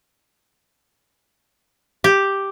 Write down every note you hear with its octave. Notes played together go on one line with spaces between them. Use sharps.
G4